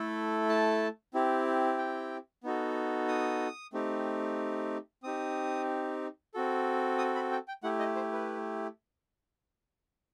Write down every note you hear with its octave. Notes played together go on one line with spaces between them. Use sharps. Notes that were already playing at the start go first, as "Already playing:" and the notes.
Already playing: A3 E4 A4
A5
C4 E4 G4
G5
B3 D#4 F#4 A4
D#6
A3 C4 D#4 G4
C4 D#4 G4 D#6
C4 F#4 A4
D#6
B5
G5
G5
A3 E4 G4 F#5
D#5
C5
B4